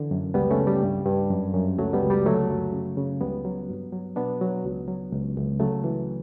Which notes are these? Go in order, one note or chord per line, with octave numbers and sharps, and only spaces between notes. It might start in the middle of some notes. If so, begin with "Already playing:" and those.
Already playing: D3 E3
F#2
C#2 G3 B3
A3 C#4
C#3
G3
G2
G2
F#2
F#2
C#2 F#3 A3
G3 B3
C#2
G3
D3 F#3 A3
F#2
C#3
C#3
C#2 G3 B3
F#3
G2
F#3
B2 B3 D4
F#3
C#2
F#3
C#2
C#2
C#3 F#3 A3
E3